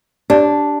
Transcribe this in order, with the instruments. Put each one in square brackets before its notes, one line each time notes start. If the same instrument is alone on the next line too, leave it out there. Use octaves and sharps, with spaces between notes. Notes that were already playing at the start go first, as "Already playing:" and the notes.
[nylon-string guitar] D4 [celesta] G4 D5 A5